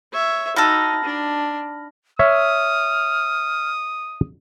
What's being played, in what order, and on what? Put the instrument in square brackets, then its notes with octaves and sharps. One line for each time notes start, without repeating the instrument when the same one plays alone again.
[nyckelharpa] C#5 E5
[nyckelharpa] D#4 [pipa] F#4 A4 [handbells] B5 F6 A#6
[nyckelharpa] D4
[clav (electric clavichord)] C#5 E5 [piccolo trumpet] D#6 [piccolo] F6